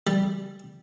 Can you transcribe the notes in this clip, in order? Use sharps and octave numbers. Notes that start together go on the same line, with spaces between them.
G3